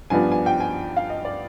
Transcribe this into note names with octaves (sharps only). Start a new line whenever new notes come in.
G2 F3 B3 D4 G#5
G#5
G5
G#5
F5
D#5
D5